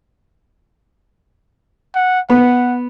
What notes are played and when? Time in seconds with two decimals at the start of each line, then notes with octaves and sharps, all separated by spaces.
1.95 F#5
2.30 B3 F#5